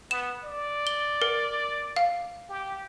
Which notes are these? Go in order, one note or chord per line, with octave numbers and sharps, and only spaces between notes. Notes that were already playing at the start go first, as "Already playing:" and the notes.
B3 E7
D5
G7
A#4
F5
G4